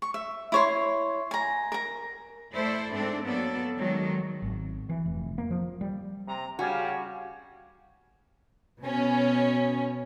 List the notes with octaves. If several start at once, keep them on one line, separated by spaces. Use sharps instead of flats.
C#6
E5
E4 C#5 C6
G#5 A#5
A#4 A#5
A3 E4 A4 C5 D5
G#2 C4 D4 A4
F#3 A#3 B3 A4 D5
D#3 F#3 G#3
G#1
E3
F1
A#3
F3
G3
C3 A#5
C#3 G3 F#4 F5 G#5
B2 C#4